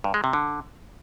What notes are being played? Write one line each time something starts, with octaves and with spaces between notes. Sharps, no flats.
G2
G#3
C3
D3